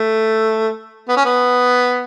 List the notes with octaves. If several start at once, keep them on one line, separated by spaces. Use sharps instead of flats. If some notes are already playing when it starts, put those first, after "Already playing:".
Already playing: A3
B3
C#4
B3